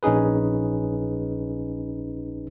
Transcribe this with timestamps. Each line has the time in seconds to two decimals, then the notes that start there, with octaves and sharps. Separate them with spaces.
0.03 A#1 C#4 D#4 G#4 B4